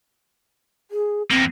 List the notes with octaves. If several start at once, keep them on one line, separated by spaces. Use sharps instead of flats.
G#4
E2 A#3 C4